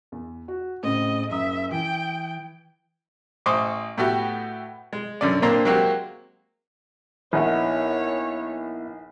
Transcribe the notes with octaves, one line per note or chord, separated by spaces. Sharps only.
E2
F#4
A2 C#3 C4 D#5
F#1 E5 A#5 D#6
E3 G5
A1 C5 D#5 C#6 D6
A2 A3 B3 F#4 G4
G#3
F#2 D3 C#4 D5
A#2 A#3 C4 D4 C5 A#5
F#3 G#3 A#3 C4 F#4 G4
A#1 B3 D#4 E4 C#5 F#5